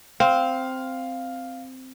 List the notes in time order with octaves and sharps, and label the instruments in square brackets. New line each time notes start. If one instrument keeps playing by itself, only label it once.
[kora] C4 [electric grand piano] F5